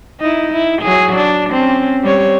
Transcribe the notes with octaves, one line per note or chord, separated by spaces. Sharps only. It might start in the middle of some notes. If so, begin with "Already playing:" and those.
D#4 E4
E4
F#3 G#4
D4
C4 C#4
G3 C4 C#5